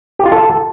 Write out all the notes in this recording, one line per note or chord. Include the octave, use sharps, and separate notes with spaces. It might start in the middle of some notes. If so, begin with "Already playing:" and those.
G4
F4
A4